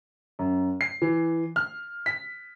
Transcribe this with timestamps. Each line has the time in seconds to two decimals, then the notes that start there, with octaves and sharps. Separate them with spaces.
0.39 F#2
0.81 C7
1.02 E3
1.56 F6
2.06 B6